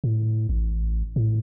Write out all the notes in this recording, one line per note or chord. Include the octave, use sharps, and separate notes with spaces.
A2
A1
A2